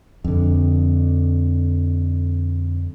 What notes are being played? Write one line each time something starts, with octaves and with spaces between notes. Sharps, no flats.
F2 D3